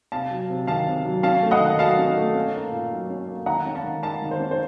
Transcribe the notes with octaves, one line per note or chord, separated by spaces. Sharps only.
C3 F5 A5
F#3
C3
D#3 F5 A5
C3
F#3
C#4 F5 A5
A3
D#5 F#5
D#3
F#3 F5 A5
C#4
A3
C#4
A#3
A#2
F#3
C#4
A#3
D#3 F#5 A#5
C#4
F5 A5
D#3
A#3 F5 A5
D#3
C5
C#4
C5